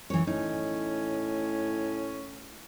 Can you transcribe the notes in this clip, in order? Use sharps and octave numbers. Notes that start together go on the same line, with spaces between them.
C#2 E3 C#5
A2 C#4 D#4